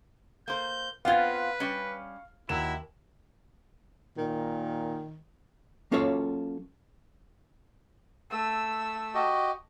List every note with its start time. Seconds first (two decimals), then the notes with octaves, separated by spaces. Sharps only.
0.48 A#3 C5 G6
1.05 B3 C4 F4 B4 F5 G#6
1.60 G3 C#4
2.49 D#2 F#3 E4 E7
4.18 A#2 D#3
5.91 F#3 A#3 C#4 F4 A4 C#5
8.30 A3 E6
9.15 F#4 G4 D#5